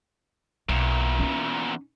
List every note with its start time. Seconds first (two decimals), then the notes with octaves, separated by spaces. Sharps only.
0.69 B1 E2 A#2
1.19 C#4 D#4